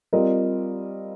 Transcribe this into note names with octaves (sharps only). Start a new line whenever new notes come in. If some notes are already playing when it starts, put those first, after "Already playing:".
G3 C4 F4 A#4 D#5